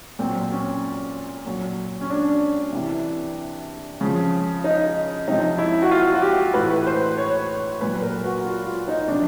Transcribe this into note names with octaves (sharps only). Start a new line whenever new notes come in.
A#2 F#3 C4
C#4
A#2 F#3
C#4
D4
C3 E3
C#3 F3
D#4
C3 F3 D#4
E4
F#4
F4
F#4
G4
A2 E3 B4
C5
C#5
A#2 F#3 B4
A#4
F#4
F4
F4
D#4
C3 F3 D4